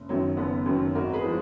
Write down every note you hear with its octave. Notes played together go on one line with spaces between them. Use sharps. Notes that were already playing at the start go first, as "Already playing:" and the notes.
Already playing: F#1
F#2 D#3 F#3
F#1 B3
F#2 D#3 F#3
G#1 F#4 A#4
G#4 B4
F3 G#3